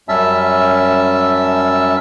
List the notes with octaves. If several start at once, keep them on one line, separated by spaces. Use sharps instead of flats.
F#2 G3 C#4 E5 A5 E6